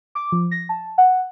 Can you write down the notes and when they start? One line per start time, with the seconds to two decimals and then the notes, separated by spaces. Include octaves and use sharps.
0.15 D6
0.32 F3
0.51 A#6
0.69 A5
0.98 F#5